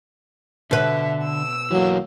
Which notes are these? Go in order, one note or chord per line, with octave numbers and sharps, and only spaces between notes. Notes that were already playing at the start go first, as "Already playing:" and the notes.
B2 D3 B4 E5
E6
E3 F#3 A#3